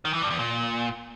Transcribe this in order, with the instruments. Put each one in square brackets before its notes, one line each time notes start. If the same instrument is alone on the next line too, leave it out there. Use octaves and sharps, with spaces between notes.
[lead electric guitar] D#3
E3
G2
E2
A#2